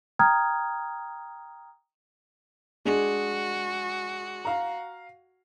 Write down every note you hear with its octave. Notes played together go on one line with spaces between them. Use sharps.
G5 A#5 D#6 F6 G#6
G#3 D4 F#4 G#4
F5 A#5